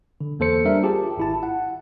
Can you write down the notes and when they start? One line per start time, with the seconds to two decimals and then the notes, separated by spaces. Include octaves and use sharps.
0.21 D3
0.39 E2 A#3 A4 C5 C#7
0.65 G3 D4 A#4 E5
0.83 F4 G4 G#4 A5
1.18 G#1 E4 A5
1.43 F#5